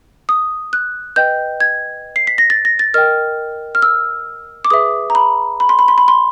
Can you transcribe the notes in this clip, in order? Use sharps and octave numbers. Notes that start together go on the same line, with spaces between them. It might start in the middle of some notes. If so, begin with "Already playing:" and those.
D#6
F#6
B4 D#5 G5 G6
G#6
C7
B6
A#6
A6
A#6
A6
A#4 D#5 G5 F6
F6
E6
D6
G#4 B4 E5 D#6
A#5
B5
B5
C6
B5
C6
B5
C6